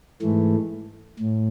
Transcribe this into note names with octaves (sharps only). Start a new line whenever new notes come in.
G#2 E3 A3
A2